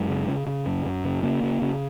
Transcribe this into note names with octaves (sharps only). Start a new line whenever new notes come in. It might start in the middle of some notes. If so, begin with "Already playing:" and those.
Already playing: F#2 G#3
C#3
C#3
C#3
F#2
F#2
C#3
C#3 A#3
C#3
C#3